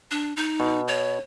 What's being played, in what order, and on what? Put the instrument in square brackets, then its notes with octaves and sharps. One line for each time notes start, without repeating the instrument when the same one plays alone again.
[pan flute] D4
D#4
[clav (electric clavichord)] B2
[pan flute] C#5